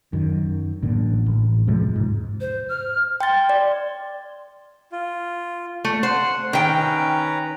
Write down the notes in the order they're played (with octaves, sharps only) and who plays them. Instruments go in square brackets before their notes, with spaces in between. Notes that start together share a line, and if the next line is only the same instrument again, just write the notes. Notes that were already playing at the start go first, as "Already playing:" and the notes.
[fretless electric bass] F#2 D#3
A1 A#2 D3
A1
E2 C3 F3 G#3
G#2
[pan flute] C5
F6
[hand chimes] G5 A6 [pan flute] C6
[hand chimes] D5
[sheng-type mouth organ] F4
[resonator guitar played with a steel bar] A3
[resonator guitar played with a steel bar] C5 [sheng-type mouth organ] F#5
[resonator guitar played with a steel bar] D#3 G5 [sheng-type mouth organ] C#4 B4 A#5